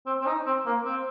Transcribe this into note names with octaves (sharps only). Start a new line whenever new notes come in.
C4
C4
D#4
C4
A#3
C4